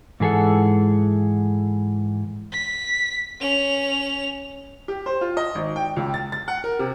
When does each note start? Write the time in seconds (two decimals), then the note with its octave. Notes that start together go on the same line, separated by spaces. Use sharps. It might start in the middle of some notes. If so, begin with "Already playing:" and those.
0.20 G#2 E3 G#4 A4 F#5
2.52 B6
3.40 C#4 F7
4.88 G4
5.06 C5
5.21 F4
5.37 D#5
5.55 G#1
5.76 G5
5.96 C#2
6.14 A6
6.32 A6
6.48 F#5
6.64 A#4
6.79 C3